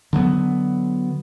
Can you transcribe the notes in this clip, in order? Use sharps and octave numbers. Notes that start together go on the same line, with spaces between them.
D3 F#3 A3 B3